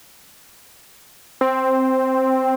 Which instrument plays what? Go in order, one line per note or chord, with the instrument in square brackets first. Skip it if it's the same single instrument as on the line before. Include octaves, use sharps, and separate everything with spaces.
[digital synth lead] C4